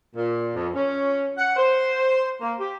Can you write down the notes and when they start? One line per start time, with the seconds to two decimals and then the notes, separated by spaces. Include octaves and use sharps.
0.16 A#2
0.55 F2
0.74 C#4
1.38 F#5
1.56 C5
2.41 A#3
2.60 G4